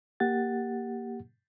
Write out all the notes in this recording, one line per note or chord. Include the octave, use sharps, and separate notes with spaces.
A#3 G4 F#5 A6